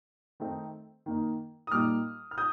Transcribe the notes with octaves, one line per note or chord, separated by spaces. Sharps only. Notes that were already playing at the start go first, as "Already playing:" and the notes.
D#3 A3 C4 D#4
D#3 A#3 D#4
D#6
A#2 G3 A#3 D#4 D6 F6
F6
D#6 G6